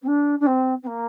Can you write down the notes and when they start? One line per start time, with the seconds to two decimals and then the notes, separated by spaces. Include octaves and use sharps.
0.02 C4
0.07 D4
0.40 D4
0.46 C4
0.82 C4
0.86 A#3